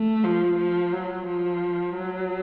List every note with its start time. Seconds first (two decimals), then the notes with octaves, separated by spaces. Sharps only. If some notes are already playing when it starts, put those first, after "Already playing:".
Already playing: A3
0.24 F3
0.58 F3
0.92 F#3
1.27 F3
1.96 F#3